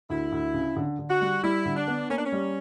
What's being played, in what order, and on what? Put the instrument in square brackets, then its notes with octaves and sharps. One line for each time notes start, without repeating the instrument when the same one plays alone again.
[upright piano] D2 [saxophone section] E4
[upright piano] D2
C#3
D3
D3
[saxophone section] F#4
[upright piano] G3
[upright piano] G3 [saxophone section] E4
[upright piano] D3
[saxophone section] D4
[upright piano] B3
[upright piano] A#3 [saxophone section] C#4
[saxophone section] D4
C#4
[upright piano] G3